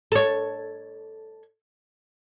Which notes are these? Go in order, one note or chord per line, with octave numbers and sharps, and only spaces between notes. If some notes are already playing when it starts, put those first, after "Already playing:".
A4 C#5